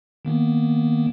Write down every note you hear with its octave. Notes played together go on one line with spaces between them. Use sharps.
D#3 A#3 B3